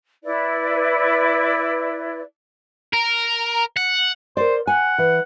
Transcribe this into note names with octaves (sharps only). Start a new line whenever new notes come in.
E4 B4 D5
A#4
F#5
A#4 C5 D5
F#5 G#5
E3